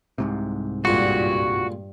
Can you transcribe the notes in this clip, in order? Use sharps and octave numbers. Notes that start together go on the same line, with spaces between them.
C2 G#2 C3
C#2 G2 A#2 F#4